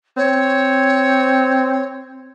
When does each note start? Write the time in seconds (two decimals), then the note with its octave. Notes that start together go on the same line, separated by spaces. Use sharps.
0.17 C4 C#5